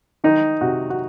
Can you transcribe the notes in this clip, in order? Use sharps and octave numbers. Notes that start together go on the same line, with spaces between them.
D#3 D#4
C3 F#4
F#4